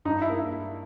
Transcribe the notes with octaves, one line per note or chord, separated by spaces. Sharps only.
G2 D#4
E4
A#3